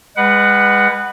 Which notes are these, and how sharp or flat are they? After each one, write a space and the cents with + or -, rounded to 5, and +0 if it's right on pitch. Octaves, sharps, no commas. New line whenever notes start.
G#3 -35 B4 +0 F#5 +10